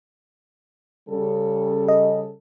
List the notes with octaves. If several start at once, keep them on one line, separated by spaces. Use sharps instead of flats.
C#3 G3 A4
D#5